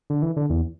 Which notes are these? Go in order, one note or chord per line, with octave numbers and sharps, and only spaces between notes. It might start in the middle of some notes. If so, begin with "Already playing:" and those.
D3
E3
D3
E2